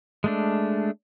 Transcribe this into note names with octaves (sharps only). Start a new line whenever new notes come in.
G#3 A3 D4